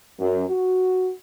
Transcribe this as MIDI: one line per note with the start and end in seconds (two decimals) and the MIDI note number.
0.20 0.44 42
0.49 1.10 66